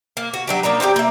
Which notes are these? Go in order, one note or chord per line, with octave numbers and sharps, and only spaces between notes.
A#3
F#4
F#3 D4 G4
A#3 D4 D#4 A#5
C4 D4 F4 G4
A#3 E5